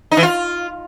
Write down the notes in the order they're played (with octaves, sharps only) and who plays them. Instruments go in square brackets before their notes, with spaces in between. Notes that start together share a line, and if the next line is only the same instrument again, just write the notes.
[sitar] D#4
E3
F4